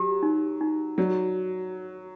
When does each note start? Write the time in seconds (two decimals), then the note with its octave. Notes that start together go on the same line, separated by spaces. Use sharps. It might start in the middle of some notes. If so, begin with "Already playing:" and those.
Already playing: F#3 G4
0.23 D#4
0.61 D#4
0.98 F#3 D5